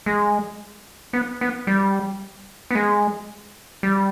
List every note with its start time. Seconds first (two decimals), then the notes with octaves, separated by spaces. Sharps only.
0.06 G#3
1.13 B3
1.41 B3
1.67 G3
2.71 B3
2.75 G#3
3.83 G3